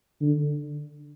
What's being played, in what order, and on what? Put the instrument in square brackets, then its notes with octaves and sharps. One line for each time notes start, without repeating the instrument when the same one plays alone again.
[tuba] D3